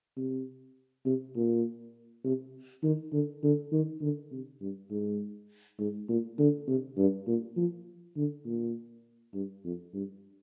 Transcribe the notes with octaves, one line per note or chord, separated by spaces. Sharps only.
C3
C3
A#2
C3
D#3
D3
D3
D#3
D3
C3
G2
G#2
G#2
A#2
D3
C3
G2
A#2
F3
D3
A#2
G2
F2
G2